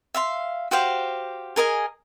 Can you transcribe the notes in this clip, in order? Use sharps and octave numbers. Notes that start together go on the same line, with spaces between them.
E5 F5 C6
F#4 G4 C5 F5
G#4 A#4 D#5 G#5